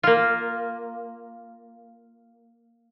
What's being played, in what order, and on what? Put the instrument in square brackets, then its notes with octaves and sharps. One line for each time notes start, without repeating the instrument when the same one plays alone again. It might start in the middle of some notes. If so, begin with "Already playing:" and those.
[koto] A#3 F4